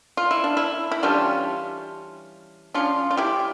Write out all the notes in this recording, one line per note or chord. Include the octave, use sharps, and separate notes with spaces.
F4
E4
D4
E4
E4
E3 G3 C#4 D4 F4
F3 C#4 D4 F4
F4
E4 G4